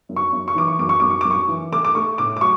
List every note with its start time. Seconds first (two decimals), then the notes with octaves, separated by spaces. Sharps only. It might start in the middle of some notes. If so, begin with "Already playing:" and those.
0.09 F#2
0.16 C#6
0.33 F#2
0.48 C#6
0.55 E3 D6
0.68 C#6
0.79 F#2 D6
0.89 C#6
1.00 F#2 D6
1.10 C#6
1.21 F#2 D6
1.31 C#6
1.48 E3
1.72 A3 D6
1.85 D6
1.95 A3 C#6
2.18 A2 D6
2.37 D6
2.41 F#3 C#6